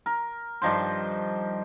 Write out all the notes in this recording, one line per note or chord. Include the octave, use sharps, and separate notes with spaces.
A#4
G2 D#3 F3 C5